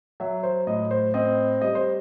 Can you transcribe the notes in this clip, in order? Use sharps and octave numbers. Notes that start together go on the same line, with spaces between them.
F#3 E5
C5
A2 D#5
C5
C4 D#5
G3 D#5
C5